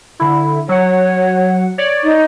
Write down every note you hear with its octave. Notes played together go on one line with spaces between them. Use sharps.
D3 E4
F#3 C#5 F#5
C#5 D5
D#4